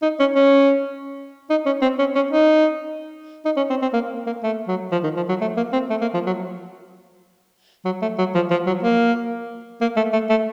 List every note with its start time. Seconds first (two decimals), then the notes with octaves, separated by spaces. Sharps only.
0.02 D#4
0.20 C#4
0.35 C#4
1.50 D#4
1.66 C#4
1.82 C4
1.99 C#4
2.15 C#4
2.31 D#4
3.45 D#4
3.57 C#4
3.70 C4
3.82 C4
3.93 A#3
4.26 A#3
4.43 A3
4.67 F#3
4.91 F3
5.03 D#3
5.16 F3
5.29 F#3
5.41 A3
5.57 A#3
5.73 C4
5.90 A3
6.01 A#3
6.14 F3
6.26 F#3
7.85 F#3
8.02 A3
8.18 F#3
8.34 F3
8.51 F3
8.66 F#3
8.83 A#3
9.81 A#3
9.96 A3
10.12 A3
10.29 A3